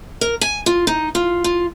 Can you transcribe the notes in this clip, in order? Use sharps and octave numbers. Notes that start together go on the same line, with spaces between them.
A#4
G#5
F4
D#4
F4
F4